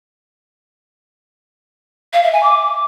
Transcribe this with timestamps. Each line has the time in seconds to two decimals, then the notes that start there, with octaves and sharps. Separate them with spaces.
2.13 F5
2.23 E5
2.33 G#5
2.43 D6